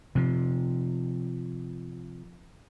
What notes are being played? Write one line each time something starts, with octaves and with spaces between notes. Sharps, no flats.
C3 F3